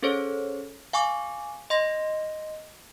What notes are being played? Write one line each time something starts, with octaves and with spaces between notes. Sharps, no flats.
C#4 G#4 A4 C5 C#5
F5 G#5 C#6 D6
D#5 C6 A#6